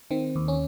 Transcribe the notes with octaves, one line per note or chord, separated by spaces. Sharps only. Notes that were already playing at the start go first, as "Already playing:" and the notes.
D#3 C4
D#2
C#4